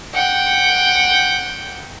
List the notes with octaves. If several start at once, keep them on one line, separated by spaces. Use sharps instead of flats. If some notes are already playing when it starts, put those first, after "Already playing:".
F#5 G5